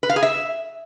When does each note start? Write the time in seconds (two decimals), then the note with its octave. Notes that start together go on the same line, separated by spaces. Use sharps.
0.03 B4
0.09 F5
0.16 G#4
0.23 E5